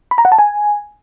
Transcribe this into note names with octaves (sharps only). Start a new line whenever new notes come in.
B5
A#5
F#5
A5
G#5